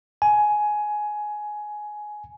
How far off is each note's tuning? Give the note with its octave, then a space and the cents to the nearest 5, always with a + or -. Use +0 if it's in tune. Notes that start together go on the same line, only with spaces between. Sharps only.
G#5 +15